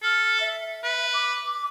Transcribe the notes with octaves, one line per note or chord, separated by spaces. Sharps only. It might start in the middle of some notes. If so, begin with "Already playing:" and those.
A4 F6
E5
B4
D6